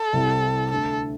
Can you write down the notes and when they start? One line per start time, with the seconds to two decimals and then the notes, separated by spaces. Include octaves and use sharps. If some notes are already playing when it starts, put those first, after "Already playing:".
Already playing: A4
0.13 C2 C3 G3 C4 E4
0.71 D2 D3 A3 A4